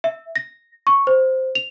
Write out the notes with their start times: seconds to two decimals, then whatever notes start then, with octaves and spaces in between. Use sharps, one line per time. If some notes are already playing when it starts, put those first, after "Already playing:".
0.04 E5
0.36 A#6
0.87 C#6
1.07 C5
1.55 F7